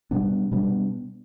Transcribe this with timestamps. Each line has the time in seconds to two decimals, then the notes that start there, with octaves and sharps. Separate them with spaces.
0.11 B2 G3 B3 D4
0.51 B2 G3 B3 D4